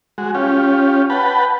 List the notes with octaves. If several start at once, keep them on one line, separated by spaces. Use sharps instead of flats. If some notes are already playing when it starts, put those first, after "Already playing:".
G#3 F#4
C#4 F4 G4
B4 F#5 G5 A5 B5